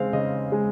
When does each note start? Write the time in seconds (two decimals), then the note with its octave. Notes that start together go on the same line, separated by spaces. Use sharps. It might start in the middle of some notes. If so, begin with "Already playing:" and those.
Already playing: C#3 G#3 C4 F5
0.13 C#3 D#5
0.52 G#3